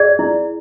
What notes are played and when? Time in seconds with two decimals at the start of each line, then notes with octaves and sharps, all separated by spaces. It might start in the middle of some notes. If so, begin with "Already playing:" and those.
Already playing: G#4 D5
0.19 E4